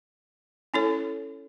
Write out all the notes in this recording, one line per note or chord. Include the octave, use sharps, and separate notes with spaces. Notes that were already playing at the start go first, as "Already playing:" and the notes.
C#4 E4 A4 C#5